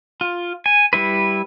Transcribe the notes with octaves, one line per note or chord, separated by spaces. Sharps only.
F4
G#5
G3 E4 B4